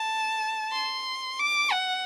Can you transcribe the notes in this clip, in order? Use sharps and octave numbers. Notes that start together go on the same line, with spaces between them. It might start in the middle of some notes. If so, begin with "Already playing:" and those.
Already playing: A5
C6
D6
F#5